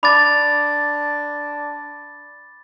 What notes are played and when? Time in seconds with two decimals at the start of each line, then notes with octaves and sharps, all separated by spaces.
0.03 D4 B5 D6 A6